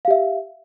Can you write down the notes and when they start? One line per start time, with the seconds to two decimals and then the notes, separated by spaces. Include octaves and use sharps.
0.05 F5
0.08 G4
0.11 E5